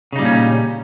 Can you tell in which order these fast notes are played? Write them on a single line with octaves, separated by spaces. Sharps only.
C#3 D#4 G3 A#2 C#4